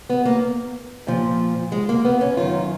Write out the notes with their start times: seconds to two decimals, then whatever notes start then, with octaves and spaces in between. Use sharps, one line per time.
0.09 B3
0.25 A#3
1.07 A#2 F3
1.72 G#3
1.89 A#3
2.05 B3
2.21 C#4
2.37 F#2 D#3 F4